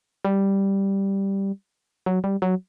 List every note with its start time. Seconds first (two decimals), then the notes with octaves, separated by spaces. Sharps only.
0.25 G3
2.06 F#3
2.24 G3
2.42 F#3